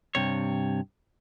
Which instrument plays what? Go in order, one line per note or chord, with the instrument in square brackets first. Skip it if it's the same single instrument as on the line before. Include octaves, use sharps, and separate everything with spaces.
[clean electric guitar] G2 C3 C#5